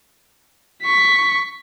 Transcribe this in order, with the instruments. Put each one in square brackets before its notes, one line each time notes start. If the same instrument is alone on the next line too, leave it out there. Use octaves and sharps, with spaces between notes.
[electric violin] C#6 B6